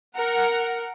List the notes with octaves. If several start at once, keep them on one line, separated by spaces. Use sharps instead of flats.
A#4 F#5